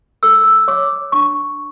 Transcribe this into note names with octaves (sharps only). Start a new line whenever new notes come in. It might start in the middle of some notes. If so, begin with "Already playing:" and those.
A4 E6
E6
C#5 D6
D4 C#6